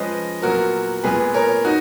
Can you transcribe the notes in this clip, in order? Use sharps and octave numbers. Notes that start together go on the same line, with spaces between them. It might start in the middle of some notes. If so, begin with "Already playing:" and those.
Already playing: F3 G#3 C#4 B4 D#5
A#2 F#3 B3 F#4 A#4
A#2 G#3 B3 G#4 B4
A#4 C#5
D#4 F#4